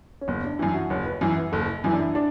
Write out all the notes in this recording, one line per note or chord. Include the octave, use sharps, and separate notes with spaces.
C#4
F#1 B3
D4
F#2 E3 E4
F#4
F#1 C#5
B4
F#2 E3
B4
F#1 A4
F#2 E3 E4
D4
E4
D4